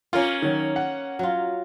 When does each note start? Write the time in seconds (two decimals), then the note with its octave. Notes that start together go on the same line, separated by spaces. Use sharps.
0.13 A#3 C#4 F4
0.42 D#3 F#3
0.76 F#5
1.19 F#3 F4